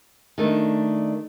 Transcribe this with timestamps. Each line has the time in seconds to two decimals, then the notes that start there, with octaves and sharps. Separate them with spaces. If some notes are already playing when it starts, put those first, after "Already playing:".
0.38 D#3 A3 D4